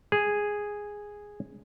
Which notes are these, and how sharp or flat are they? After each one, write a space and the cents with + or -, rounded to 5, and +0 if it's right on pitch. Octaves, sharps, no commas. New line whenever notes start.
G#4 -5